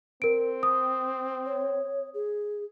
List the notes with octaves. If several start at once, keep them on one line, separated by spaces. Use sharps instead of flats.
C4 A#4 D7
D#6
C#5
G#4